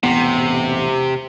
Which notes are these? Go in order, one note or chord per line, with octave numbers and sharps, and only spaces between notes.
E1 A1 C3 B3